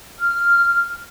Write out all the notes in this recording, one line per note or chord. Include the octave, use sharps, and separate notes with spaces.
F6